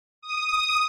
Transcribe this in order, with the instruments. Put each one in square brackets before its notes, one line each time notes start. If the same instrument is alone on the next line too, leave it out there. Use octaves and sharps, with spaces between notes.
[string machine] D#6